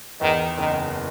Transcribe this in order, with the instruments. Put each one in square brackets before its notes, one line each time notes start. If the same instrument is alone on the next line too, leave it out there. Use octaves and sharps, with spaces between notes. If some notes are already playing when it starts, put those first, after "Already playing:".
[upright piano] E2 [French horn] D#3
[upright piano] F#1 [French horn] D#3